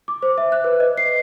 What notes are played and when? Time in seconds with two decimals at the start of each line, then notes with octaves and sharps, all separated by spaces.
0.08 D6
0.23 C5
0.38 E5
0.52 F#6
0.64 B4
0.80 D#5
0.97 C7